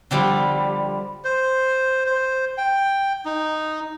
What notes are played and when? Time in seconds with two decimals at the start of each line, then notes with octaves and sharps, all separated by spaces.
0.11 D3 F3 G3
1.24 C5
2.06 C5
2.58 G5
3.25 D#4